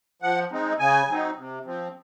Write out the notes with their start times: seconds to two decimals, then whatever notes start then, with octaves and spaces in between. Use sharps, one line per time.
0.22 F3 F#5
0.51 G#3 C4 D#4
0.79 C#3 G#5
1.08 F#3 C4 D#4
1.36 C3
1.65 F3 C4